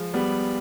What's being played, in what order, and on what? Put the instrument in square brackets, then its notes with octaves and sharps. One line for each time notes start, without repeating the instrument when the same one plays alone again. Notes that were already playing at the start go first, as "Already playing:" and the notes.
Already playing: [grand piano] F3 G#3
G3 B3